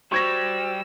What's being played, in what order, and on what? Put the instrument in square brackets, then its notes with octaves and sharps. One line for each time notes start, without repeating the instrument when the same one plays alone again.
[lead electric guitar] G3 [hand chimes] F#4 C5 [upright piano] C#6 G#6 A#6 [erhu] E6